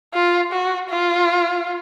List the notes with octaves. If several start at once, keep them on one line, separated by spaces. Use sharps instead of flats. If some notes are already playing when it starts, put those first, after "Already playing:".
F4
F#4
F4